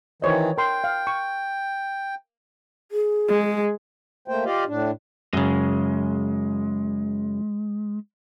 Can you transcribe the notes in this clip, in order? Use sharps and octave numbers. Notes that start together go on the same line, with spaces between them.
D#3 E3 C5 C#5 D#5
A#4 G5 C6
F5
C#6
G#4
G#3
A3 A#3 C5 G5
F4 G4 D5 D#5 F5
A2 D4
F#2 C#3 G#3